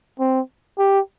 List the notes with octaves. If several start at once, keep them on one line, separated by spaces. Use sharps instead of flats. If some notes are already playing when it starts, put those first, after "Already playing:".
C4
G4